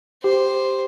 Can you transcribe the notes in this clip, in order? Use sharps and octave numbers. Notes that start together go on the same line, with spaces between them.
G4 C5